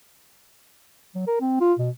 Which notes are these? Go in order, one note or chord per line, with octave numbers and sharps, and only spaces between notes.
F#3
A#4
C4
F4
B2